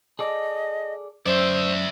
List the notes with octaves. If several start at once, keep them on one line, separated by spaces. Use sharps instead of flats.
G#4 A4 D5 D#5
F#2 C5 D5 E5